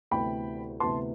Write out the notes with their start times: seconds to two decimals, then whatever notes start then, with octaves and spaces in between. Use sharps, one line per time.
0.11 D2 C3 E3 B3 G5 B5
0.80 D2 C3 E3 B3 A5 C6